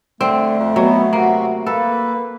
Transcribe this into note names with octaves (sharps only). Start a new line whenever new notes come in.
D3 A3 C4
F2
B2 F#3 B3
C3 A#3 F#4
A#3 A4 B4